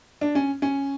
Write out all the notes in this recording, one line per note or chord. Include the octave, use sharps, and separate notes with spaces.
D4
C#4
C#4